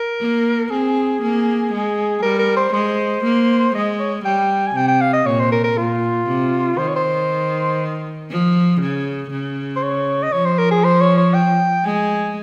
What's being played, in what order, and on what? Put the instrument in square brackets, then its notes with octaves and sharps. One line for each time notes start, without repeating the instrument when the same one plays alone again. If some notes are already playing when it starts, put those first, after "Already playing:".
Already playing: [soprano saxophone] A#4
[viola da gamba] A#3
[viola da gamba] C4 [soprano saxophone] G#4
[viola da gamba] A#3
G#3
[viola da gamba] G3 [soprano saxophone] A#4
[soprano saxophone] A#4
C5
[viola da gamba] G#3 [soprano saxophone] C5
[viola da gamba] A#3
[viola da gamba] G#3 [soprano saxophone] D#5
[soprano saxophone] C#5
[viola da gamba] G3 [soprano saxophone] G5
[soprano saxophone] G#5
[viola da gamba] C3 [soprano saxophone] G5
[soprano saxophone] G5
F5
D#5
[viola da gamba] A#2 [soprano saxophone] C#5
[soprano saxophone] C5
A#4
A#4
[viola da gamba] A#2 [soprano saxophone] F4
[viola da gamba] C3
[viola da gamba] D#3 [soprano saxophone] C5
[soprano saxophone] C#5
C5
[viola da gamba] F3
C#3
C#3
[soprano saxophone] C5
C#5
D#5
[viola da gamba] F3 [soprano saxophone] C#5
[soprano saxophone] C5
A#4
G#4
C5
C#5
C#5
G5
[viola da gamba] G#3 [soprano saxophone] G#5